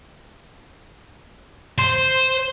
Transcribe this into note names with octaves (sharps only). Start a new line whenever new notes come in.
C5